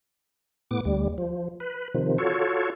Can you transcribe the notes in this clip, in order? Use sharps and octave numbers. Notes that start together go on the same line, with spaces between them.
A2 B3 D6
D2 G3
F3
B4
C3 D#3 F3
F4 F#4 A4 C#5